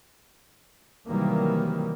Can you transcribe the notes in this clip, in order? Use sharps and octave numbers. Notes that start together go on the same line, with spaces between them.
C3 D#3 E3 F#3 G3 A#3